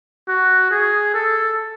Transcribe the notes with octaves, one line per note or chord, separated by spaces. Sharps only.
F#4
G#4
A4